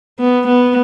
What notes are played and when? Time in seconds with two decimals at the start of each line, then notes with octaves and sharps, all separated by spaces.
0.19 B3
0.48 B3